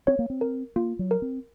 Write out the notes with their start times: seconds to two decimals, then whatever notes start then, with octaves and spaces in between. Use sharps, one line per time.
0.07 C4 C#5
0.19 A#3
0.30 C4
0.41 A#4
0.76 A#3 F4
0.99 F#3
1.11 A#4
1.22 C4